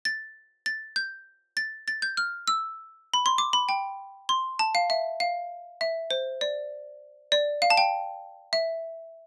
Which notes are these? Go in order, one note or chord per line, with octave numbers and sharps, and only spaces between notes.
A6
A6
G6
A6
A6
G6
F6
E6
B5
C6
D6
B5
G5
C6
A5
F5
E5
F5
E5
C5
D5
D5
F5
A5
G5
E5